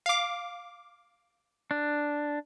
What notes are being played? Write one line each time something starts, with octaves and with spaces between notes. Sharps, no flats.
F5 D6
D4